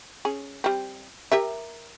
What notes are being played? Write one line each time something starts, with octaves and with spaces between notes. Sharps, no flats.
C#4 G#4
G3 C4
G4 A#4 E5